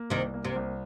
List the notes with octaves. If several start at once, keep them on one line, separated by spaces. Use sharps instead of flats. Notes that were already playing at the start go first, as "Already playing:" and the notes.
Already playing: A#3
C2 C3 D#3
A#3
C3
C2